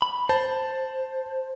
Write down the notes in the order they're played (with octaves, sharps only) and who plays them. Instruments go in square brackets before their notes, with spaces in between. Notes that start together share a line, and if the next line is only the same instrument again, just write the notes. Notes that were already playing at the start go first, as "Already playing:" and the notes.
[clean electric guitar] B5
[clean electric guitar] C5 [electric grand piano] A5